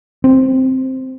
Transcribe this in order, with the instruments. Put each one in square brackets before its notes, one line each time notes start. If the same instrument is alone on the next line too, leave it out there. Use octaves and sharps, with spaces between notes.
[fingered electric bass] C4